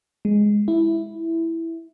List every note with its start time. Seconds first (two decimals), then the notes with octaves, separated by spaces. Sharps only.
0.25 G#3
0.68 E4